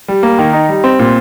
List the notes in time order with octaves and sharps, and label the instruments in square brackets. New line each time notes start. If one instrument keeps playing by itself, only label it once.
[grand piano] G3
A#3
D#3
D#4
G3
C4
A#2